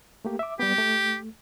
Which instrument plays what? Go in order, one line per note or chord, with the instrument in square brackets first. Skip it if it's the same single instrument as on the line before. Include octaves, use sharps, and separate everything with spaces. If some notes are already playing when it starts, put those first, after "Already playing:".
[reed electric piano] A3 A#3 G4
E5 D6
[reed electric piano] G3 B3 [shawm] G4
[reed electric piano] A3